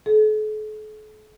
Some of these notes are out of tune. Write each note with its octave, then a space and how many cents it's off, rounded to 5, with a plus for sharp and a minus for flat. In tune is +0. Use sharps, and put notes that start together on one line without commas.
A4 -45